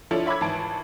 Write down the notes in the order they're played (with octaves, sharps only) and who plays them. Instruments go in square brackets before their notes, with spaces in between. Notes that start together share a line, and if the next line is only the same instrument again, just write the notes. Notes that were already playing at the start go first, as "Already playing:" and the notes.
[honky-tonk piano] F3 D4 E4 F4 A4 C#5
C#5 E5 B5 D6 E6 G#6
G#1 E3 A5 D7